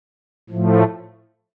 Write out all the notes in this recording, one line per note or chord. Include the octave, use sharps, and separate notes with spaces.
A2 F3 A3